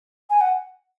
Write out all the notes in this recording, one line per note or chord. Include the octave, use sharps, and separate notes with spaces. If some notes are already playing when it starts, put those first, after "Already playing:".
G#5
F#5